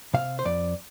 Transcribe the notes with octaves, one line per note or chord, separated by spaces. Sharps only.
C3 F5
C5
F2 D5